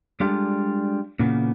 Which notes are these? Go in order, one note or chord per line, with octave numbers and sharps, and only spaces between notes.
G3 G#3 D4 F4 G4 A4
A#2 C#3 E3 A#3 B3